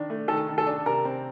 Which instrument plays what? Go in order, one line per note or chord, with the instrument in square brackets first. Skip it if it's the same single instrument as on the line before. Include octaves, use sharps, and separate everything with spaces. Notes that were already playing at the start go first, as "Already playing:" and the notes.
Already playing: [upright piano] D#3 D4
A3
[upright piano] D#3 [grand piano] A4
[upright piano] D#3
[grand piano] A4
[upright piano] D4
[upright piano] C3 [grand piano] A#4
[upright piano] C4